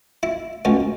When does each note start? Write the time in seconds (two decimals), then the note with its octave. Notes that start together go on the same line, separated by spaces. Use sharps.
0.23 E4
0.65 C#2 B2 C#4